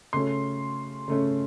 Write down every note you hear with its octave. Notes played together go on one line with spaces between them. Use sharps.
C#3 A3 C#4 C6
C#3 A3 C#4